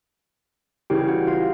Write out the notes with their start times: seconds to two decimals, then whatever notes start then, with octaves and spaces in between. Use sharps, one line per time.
0.90 C#3 E3 G3 G4 G5
1.08 F#4 F#5
1.27 F4 F5